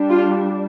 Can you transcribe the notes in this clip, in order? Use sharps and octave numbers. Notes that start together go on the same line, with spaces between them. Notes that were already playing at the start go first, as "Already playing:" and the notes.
Already playing: G3 D4
F4